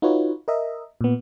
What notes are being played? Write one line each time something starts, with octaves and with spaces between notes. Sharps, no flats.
D#4 F4 F#4 B4 C#5
A#4 D#5 E5
A#2 B3